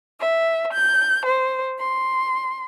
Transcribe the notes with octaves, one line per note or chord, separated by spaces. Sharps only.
E5
G6
C5
C6